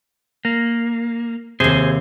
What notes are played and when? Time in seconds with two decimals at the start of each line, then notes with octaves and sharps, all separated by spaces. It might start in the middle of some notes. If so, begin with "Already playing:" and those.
0.45 A#3
1.60 D#2 C3 G#4 C5